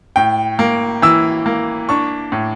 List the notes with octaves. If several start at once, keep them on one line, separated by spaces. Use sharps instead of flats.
A2 G5
A#3
E3 E6
A#3
D4 C#6
A2